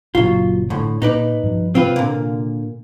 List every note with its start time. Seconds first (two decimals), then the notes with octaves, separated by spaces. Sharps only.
0.15 F#1 A#2 F#3 F4
0.70 A2 D3
1.02 A#2 D#4 B4 D5
1.43 G2 F3
1.75 C3 C4 F4 B4
1.96 A#2 D3 A#3